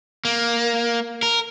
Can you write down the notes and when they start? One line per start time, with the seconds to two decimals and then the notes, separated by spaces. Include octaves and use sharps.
0.25 A#3
1.23 A#4